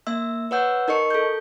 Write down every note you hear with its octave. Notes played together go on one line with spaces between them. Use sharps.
A#3 E5 E6
B4 C#5 F#5 E6 G6
D#4 A#4 D#5 C#6 C#7
A4 G6